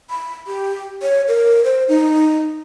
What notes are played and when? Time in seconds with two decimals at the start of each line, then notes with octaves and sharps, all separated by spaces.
0.10 B5
0.47 G4
1.02 C#5
1.28 A#4
1.64 C5
1.89 D#4